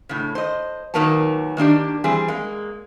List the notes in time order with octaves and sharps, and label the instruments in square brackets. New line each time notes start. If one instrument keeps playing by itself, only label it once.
[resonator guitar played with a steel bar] A2 C#3
C5 D#5
A#2 D#3 F#3 A#3 B4 A5
D#3 A#3 D4 G4
E3 G3 C4 G#4
G#3 A#3